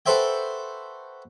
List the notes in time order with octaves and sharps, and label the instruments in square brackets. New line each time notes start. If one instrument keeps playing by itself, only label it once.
[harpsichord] F#4 A4 B4 C5 E5 G5